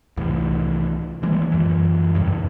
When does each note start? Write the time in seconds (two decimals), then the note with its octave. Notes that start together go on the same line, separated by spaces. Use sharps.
0.17 C2 A2 E3
1.23 E3 G3 G#3 A#3
1.51 F#2 E3
2.15 E1 C#2 G2